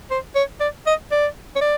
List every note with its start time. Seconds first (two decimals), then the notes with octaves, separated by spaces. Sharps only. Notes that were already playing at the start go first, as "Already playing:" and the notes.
0.11 C5
0.35 C#5
0.60 D5
0.87 D#5
1.12 D5
1.56 C#5
1.61 D5